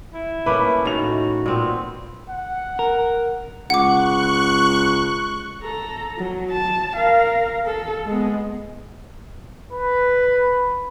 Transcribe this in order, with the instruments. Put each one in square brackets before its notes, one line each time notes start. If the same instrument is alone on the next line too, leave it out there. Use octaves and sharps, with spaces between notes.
[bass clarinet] E4
[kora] A3 A#3 C#4 [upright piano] B4 B5 D6
[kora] A2 D#3 [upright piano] D#4 F7 [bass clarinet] F#4
[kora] A#2 B3 C4
[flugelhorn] F#5
[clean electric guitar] A#4
[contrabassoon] C#2 [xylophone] F#5 D6 [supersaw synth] C#6 F#6
[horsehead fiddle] A4 A#5
F#3
A5
A#4 F5
A4
G#3 B3
[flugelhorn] B4